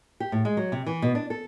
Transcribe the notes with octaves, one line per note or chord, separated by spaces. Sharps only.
G4
A2
G#3
F#3
C3
E3
B2
D4
A4